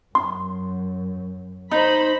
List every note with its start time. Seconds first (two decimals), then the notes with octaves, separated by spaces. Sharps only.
0.15 F#2 C6
1.71 D#4 C5 B5